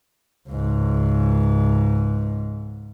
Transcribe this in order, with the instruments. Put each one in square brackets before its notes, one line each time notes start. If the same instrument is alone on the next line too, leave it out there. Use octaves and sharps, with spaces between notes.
[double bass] C#2 G#2